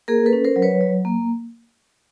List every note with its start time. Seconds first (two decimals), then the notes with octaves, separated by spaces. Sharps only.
0.08 A#3 G#4 A#4
0.26 A4 B4
0.33 C#4
0.44 A#4 C5
0.56 F#3
0.62 B4 C#5
0.81 F#3
1.05 A#3